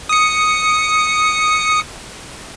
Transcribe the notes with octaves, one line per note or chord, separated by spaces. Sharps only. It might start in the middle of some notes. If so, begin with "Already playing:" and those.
D#6 C#7